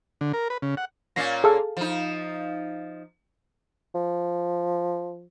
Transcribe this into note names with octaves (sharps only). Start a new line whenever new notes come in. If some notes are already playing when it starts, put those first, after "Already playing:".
D3
A#4
B4
C#3
F#5
A#2 A#3 C#4 A#6 C7
G#4 A4 F5
F3 D#4
F3